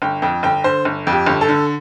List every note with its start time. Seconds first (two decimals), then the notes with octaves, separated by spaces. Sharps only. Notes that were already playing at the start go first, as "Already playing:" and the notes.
0.02 G1 G5
0.22 F2 G5
0.43 G1 G5
0.64 D3 C5
0.85 G1
1.07 F2
1.13 G4
1.26 G1
1.41 A4
1.48 D3